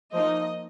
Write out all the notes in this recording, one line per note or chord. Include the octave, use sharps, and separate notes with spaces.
F3 A#3 D#4 D#5